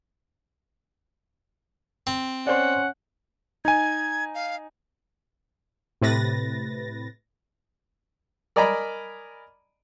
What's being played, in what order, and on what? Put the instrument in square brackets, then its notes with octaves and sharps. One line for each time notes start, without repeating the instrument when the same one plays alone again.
[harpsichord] C4
[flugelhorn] C#4 [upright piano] C5 D5 [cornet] F#5
[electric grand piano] D#4 G#5 [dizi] G#6
[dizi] F5
[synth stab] A2 C3 B4 A6 A#6
[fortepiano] A#4 D5 D#5 G#5 A#5 B5